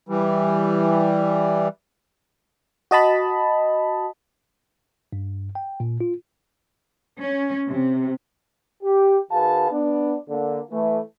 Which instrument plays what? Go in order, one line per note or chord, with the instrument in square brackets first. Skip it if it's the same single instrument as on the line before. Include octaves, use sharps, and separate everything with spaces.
[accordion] E3 G3
[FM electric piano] F#4 D#5 A5 B5
[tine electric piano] G2
G5
A#2
F4
[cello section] C#4
C3
[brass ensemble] G4
D#3 F#4 G#4 B4 F5 A5
B3 D4
D3 A#3
E3 A3